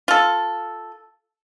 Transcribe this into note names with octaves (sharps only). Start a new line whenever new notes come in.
F4 A4